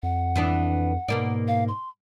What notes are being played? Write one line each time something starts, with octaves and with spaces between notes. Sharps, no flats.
F2 F#5
E3 B3 D4
G#2 B2 A#3 D5
F5
C6